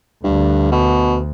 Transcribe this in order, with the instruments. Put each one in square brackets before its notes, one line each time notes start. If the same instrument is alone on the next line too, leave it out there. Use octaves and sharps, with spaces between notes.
[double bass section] D2 [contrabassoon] G2
[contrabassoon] B2